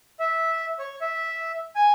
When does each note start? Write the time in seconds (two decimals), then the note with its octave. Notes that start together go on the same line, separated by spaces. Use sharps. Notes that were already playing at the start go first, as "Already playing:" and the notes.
0.20 E5
0.79 C#5
1.01 E5
1.76 G#5